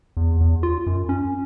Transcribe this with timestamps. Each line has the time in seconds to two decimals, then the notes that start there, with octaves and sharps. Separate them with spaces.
0.17 E2
0.41 E2
0.63 F4
0.87 F#2
1.09 C#4